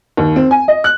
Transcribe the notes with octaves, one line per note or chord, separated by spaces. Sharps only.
D#2
C4
G#5
D#5
F#6